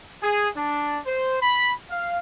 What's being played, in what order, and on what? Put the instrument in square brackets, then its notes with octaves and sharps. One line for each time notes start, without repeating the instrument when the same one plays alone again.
[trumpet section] G#4
D4
C5
B5
F5